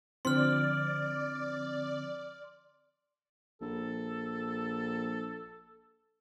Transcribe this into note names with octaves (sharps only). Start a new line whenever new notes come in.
D3 F3 C4 D5 C6 F6
A#1 A4